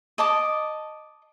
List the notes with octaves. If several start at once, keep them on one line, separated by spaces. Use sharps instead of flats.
D#5 A5 D6